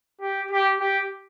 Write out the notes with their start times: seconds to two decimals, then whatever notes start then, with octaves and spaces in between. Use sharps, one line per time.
0.21 G4
0.51 G4
0.80 G4